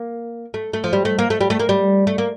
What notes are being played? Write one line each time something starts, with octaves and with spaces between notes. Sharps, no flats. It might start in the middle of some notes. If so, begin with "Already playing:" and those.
Already playing: A#3
A3
A3
F3
G3
A3
A#3
A3
G3
A3
A#3
G3
A3
A#3